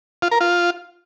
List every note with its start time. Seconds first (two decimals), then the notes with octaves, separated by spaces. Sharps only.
0.22 F4
0.31 A#4
0.41 F4